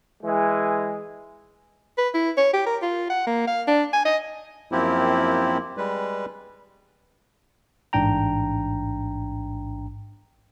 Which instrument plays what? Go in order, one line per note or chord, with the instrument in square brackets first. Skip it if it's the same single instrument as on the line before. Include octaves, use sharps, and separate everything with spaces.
[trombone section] E3 G#3
[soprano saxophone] B4
E4
C#5
G4
A#4
F4
F#5
A#3
F5
D4
G#5
D#5
[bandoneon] F#2 F3 A#3 C4 E4 G4
G3 G#3 B4
[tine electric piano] A1 G#2 D4 G5 A#5